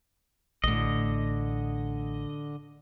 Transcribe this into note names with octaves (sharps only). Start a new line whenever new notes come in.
A1 A2 D3 D#5